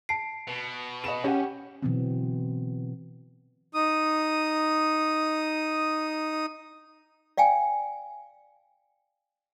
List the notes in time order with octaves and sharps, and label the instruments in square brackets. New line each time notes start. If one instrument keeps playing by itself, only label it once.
[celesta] A5 C7 [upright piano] D7
[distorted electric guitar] B2
[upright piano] D#5 B5 E7
[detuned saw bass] C#4 [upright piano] G4 F#5
[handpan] B2 D3 E3 F#3 B3 C4
[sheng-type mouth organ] D#4 D#6
[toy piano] D5 F5 G5 G#5